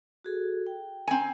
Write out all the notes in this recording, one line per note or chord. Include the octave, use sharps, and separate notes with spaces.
F#4 G#4 A4
G5
C4 G#5